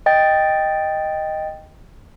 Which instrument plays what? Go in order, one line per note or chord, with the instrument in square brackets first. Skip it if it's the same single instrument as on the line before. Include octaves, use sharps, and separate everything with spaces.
[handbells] D#5 G5 A6